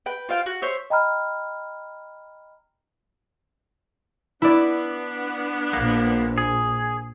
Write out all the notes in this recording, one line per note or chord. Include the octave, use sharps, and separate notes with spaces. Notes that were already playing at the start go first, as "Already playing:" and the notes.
B4 G5
F4 C5 F5 G5
F#4
C5 C#5 E5
D#5 G5 A#5 B5 F6
B3 D4 E4 D5
A#1 A#3
G#4